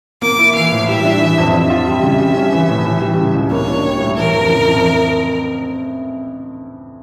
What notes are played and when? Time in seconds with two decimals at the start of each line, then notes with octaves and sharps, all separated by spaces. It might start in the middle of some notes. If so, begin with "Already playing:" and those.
0.22 A#3 D6
0.38 E4
0.55 E3 F5
0.72 A2
0.87 G3 E5
1.05 D4
1.21 E3
1.38 F2
1.53 D4 E5
1.70 F4
1.87 G3
2.03 C#3
2.19 G3
2.36 C#4
2.52 E3
2.69 A2
2.85 E3
3.01 G3
3.18 C#3
3.35 C#2
3.51 A#3 C#5
3.68 D4
3.84 G3
4.00 A2
4.16 E3 A#4
4.33 F2
4.49 C#3
4.65 F2